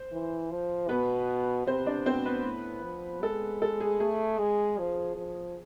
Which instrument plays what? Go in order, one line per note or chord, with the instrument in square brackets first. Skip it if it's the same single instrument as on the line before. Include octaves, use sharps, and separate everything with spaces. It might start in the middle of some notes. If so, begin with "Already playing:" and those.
Already playing: [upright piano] C5
[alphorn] E3
F3
[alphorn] B2 [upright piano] B3 B4
[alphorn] C3 [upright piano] C4 C5
[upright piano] D4 D5
[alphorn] B2 [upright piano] C4 C5
[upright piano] B3 B4
[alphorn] A2
F3
[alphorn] G#3 [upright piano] A4
[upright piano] A4
G#4
[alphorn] A3 [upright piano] G#4
[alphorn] G#3
F3
F3